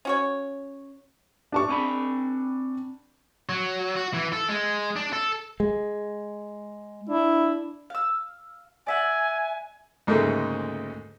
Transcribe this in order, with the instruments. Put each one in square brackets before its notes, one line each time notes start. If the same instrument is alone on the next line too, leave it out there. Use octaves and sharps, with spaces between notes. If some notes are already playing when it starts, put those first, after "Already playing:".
[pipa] C#4 F#4 C#5
[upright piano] D4 A5 C#6
[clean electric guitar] C4 G#5 B5
[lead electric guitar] F#3
F#4
E3
A4
G#3
D4
A4
[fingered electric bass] G#3
[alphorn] D4 [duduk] E4
[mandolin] F5 E6
[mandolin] D5 E5 F#5 [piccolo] G#5
[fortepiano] D2 G#2 C#3 A3 A#3